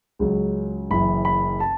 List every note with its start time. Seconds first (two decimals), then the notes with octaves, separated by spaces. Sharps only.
0.19 C#2 C#3 F#3
0.91 F#1 F#2 E3 B5
1.25 B5
1.60 A5